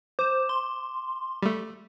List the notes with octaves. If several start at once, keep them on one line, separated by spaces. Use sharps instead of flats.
C5 D6 E7
C6
G3 A3